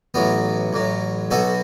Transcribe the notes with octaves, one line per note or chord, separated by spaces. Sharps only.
A1 A2 F#3 B3
A1 A2 F#3
B1 B2 B3 F#4 A4